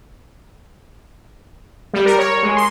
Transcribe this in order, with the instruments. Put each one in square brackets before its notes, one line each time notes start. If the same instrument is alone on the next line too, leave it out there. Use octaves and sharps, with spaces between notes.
[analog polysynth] G3
A#4
C#5
G#3
C6